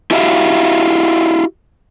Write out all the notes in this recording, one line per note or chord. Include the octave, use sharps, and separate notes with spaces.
E4 F#4 G4 E5 F5